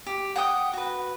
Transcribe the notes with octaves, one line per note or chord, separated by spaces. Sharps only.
G4
F#5 G5 D#6
F#4 B4